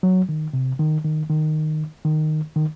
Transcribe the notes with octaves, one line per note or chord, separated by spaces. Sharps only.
F#3
D#3
C3
D#3
D#3
D#3
D#3
D#3